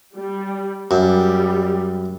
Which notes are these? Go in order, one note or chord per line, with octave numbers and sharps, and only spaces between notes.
G3
F#2 G3